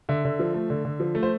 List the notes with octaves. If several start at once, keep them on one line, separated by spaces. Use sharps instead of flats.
D3 E5
D3
F3
A3
D3
D3
F3
A3
C5